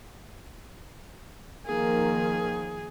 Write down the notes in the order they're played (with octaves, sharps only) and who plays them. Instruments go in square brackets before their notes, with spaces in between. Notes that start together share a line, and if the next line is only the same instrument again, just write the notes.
[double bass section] D#3 F3 A#3 [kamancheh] G#4